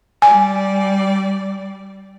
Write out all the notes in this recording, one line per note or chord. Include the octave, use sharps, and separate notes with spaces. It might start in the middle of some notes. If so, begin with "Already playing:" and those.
G3 D5 G#5